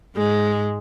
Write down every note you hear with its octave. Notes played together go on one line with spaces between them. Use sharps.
G#2 G#3